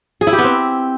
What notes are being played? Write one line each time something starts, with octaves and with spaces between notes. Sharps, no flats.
G#4
E4
G4
B3
C4